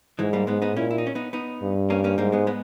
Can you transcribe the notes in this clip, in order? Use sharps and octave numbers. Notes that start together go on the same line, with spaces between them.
G#2 E3 G#3
G3 A#3
G#2 G#3 B3
B3 D#4
A#2 C#4 E4
E4
D#4
C#4
B3 D#4
B3 D#4
G2
A#3 C#4
A#3 C#4
G#2 G3 A#3
G#3 B3
G#3 B3